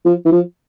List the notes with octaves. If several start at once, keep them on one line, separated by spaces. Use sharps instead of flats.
F3
E3
F3